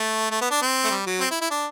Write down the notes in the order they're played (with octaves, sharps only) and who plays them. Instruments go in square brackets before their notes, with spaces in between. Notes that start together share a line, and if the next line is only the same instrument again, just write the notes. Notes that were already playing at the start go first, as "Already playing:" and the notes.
Already playing: [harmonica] A3
A3
B3
D4
C4
A3
G3
F#3
C4
E4
E4
D4